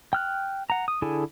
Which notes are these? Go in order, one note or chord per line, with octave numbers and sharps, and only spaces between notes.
G5 F6 F#6
F#5 A#5
D#6
D3 E4 G#4 A4 G#5